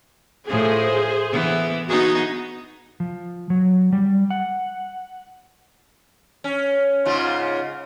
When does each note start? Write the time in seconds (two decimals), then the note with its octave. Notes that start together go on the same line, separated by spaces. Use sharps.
0.48 A2 F3 G#4 C5
1.31 E3 B3
1.88 B3 D#4 F#4 G#4
3.00 F3
3.50 F#3
3.93 G3
4.30 F#5
6.44 C#4
7.05 G#2 C#3 F4